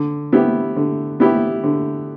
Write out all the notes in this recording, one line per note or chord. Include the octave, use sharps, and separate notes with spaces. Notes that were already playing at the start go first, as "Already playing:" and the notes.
Already playing: D3
B3 E4 G4
D3
B3 E4 G4
D3